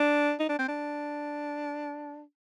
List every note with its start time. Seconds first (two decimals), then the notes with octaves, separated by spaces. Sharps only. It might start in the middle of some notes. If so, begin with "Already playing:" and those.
Already playing: D4
0.40 D#4
0.49 D4
0.59 C4
0.68 D4